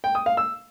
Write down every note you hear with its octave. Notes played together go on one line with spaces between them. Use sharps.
G5
D#6
F5
E6